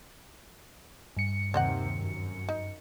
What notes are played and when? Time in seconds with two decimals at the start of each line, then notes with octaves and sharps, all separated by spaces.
1.17 G2 C#7
1.54 D#2 C3 D#3 C5 D#5 F#5
1.96 F#2
2.49 D#4